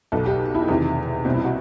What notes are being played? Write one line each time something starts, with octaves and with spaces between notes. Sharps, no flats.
B1 B2 A4
G4
E4
D#4
E2 C3 D#3 E4
C2 B2 C4
E4
F#4